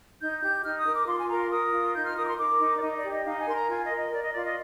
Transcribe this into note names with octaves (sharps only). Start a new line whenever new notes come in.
D#4 G6
G4 G6
D#4 F6
D#6
A#4
D6
F4 C6
G#5
A#4 A#5
C6
A#4 D#6
F4
D#4 G6
F6
A#4 D#6
D6
C6
A#4 D6
D#4
D5
D#4 D#5
D5
G4
D#5
D#4 F5
G#5
A#4 C6
A#5
F4 G#5
D#5
A#4
D#5
A#4 D5
D#5
F4 D5
D#5